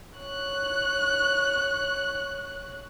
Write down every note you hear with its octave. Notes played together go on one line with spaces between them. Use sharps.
C#5 F#6